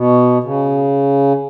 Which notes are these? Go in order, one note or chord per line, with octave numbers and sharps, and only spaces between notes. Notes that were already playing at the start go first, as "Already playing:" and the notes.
Already playing: B2
C#3